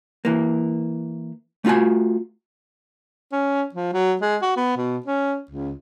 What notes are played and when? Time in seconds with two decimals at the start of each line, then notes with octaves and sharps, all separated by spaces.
0.25 E3 A#3
1.65 A3 C#4 F4 F#4 G#5
3.32 C#4
3.75 F3
3.93 F#3
4.22 G#3
4.42 F#4
4.57 B3
4.77 B2
5.06 C#4
5.51 C#2